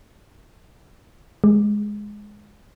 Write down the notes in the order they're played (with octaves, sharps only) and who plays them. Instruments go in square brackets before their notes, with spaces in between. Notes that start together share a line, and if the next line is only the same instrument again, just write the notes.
[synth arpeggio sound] G#3